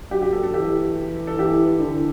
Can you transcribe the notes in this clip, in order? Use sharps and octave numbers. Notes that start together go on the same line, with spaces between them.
F#3 G4
G4
A4
A4
E3 G4
A4
E3 G4
D3